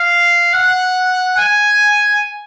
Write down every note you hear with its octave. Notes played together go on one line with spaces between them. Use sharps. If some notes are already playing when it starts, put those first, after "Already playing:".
Already playing: F5
F#5
G#5